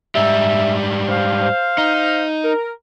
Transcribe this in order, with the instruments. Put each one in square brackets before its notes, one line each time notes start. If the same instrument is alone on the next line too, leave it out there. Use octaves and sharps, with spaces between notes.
[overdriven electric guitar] G#2 G3 [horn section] E5
[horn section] C5 F5
[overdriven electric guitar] D#4
[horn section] A#4